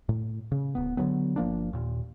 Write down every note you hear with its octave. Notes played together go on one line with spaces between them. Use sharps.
A2
C#3
D1 B3
D3 D#3 F#3 B3
G1 F3 A#3 D4
D#2 A#2